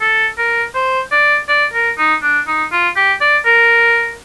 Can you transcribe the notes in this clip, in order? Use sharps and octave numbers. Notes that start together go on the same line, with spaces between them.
A4
A#4
C5
D5
D5
A#4
D#4
D4
D#4
F4
G4
D5
A#4